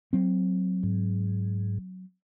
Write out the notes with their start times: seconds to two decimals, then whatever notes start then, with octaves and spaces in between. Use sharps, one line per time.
0.13 F#3 C4
0.83 G#2